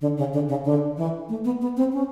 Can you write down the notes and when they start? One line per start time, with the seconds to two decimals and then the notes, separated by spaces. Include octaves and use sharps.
0.01 D3
0.18 C#3
0.33 D3
0.49 C#3
0.65 D3
0.97 E3
1.29 A3
1.45 B3
1.61 B3
1.77 C4
1.93 C#4